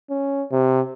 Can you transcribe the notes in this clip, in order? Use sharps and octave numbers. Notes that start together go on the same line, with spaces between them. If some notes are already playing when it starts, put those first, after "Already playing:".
C#4
C3